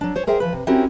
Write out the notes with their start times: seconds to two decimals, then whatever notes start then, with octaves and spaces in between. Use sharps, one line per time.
0.01 F#3 D4
0.15 C5 C#5
0.27 G#4 A#4 C5 E5 G5
0.40 E3 F3 B4
0.53 C3
0.67 C4 C#4 E4 F#4 G4 A#4